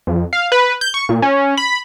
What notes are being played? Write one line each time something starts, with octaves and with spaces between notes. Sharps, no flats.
F2
F5
B4
G6
C#6
A#2
C#4
B5